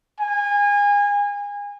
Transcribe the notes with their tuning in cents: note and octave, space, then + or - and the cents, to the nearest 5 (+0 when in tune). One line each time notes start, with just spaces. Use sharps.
G#5 -30